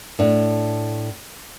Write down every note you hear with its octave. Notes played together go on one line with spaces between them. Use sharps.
A2 D4